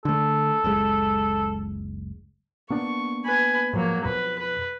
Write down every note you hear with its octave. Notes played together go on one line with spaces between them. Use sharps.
D3 A3 A4
F#1 C#2 G#3
A#3 B3 D4 C#6
B4 G#5
G#2 F3 F#3 A#3
F2 B2 B4
B4